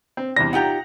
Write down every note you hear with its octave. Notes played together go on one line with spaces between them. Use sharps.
C4
E2 C3 G3 A#6
D#4 F4 G4 F#5 A#5